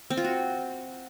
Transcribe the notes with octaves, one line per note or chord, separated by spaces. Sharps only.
C4
F4
F#4